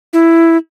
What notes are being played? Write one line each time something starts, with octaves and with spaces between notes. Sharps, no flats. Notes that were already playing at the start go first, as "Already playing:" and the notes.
E4